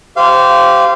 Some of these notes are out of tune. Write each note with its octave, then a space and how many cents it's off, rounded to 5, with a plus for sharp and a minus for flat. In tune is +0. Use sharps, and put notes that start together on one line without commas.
G4 -15 C5 -20 F5 -25